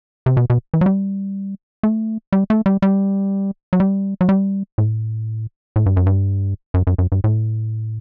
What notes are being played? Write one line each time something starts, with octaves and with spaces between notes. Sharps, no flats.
C3
B2
B2
E3
F#3
G3
A3
G3
A3
G3
G3
F#3
G3
F#3
G3
A2
A2
G2
F#2
G2
F#2
F#2
F#2
G2
A2